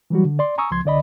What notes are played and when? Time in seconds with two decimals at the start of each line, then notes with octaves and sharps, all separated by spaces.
0.10 E3 F#3 G3 F#4
0.25 D3
0.39 D5 C6
0.58 G#5 A#5 C#6 D#6 E6
0.71 C#2 F3 C6 G#6
0.84 C2 D3 D5 D#5 B5